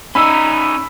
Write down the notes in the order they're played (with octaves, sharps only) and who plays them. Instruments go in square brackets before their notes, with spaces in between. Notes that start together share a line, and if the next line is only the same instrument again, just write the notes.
[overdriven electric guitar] C#4 D#4 [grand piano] B5 E6